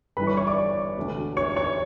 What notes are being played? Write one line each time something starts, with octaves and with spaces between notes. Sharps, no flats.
G1 G2 E3 B4 B5
C#5 C#6
C#5 C#6
D5 D6
E1 D2 D3
C#5 C#6
C#5 C#6